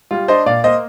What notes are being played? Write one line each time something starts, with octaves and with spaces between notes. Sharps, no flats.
G3 F4
D4 C5 D#5
A#2 D5 F5
A#3 C5 D#5